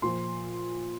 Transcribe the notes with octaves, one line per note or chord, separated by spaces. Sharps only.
A#2 F3 C6